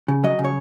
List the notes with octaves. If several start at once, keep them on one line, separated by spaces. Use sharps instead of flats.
C#3
F#3 D#5
C#3
C#5